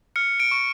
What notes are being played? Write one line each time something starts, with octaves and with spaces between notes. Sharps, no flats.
F6 C#7
D7
C#6